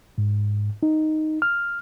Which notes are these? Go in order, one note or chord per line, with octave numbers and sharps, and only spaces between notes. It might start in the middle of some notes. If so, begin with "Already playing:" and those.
G#2
D#4
F6